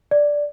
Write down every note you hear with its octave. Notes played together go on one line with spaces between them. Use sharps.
D5